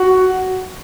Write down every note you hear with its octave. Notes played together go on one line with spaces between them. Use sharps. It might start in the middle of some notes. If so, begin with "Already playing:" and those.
Already playing: F#4